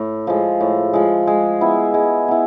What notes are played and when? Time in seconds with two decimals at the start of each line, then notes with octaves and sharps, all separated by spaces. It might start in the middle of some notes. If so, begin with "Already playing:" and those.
Already playing: A2
0.27 F3 G#3
0.60 A2
0.93 F3 G#3
1.27 G#3
1.61 B3 E4
1.94 G#3
2.28 B3 E4